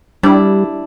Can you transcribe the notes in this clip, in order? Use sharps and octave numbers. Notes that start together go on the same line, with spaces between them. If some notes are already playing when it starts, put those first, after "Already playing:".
G3 D4 E4